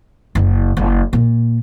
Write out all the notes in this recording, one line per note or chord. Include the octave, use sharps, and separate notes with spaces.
F#1
F#1
A#2